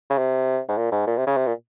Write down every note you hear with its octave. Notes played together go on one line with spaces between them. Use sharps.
C#3
C3
G#2
A#2
G#2
A#2
C3
C#3
C3
A#2